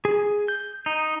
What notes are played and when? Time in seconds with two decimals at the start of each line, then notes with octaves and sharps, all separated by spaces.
0.05 G#4
0.48 G6
0.86 D#4